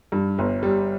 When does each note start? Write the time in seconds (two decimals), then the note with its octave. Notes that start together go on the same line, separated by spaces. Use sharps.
0.12 G2
0.38 G1
0.63 G3